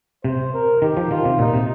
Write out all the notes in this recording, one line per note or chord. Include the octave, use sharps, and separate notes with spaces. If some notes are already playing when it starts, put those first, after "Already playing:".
C3 C5
A#4
D#3 G4
F3
D#3 F4
C3
A#2 D#4
C3